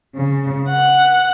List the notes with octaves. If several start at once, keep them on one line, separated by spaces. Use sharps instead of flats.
C#3
F#5